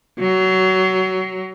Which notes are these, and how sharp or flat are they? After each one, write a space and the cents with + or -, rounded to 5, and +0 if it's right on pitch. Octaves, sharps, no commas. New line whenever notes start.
F#3 +20